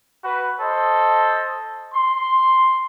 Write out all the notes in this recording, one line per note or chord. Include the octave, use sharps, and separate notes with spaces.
F#4 B4
A4 C5 D#5
C6